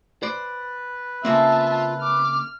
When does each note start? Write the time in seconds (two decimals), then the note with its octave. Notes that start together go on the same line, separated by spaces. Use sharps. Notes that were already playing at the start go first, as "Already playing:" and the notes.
0.23 B4 C5 D5
1.25 C#3 A#3 C4 F4 E5 A5
2.01 D6 F6